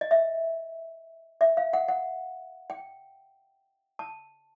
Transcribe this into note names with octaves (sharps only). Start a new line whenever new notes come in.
D#5
E5
E5
F5
F#5
F#5
G5
A5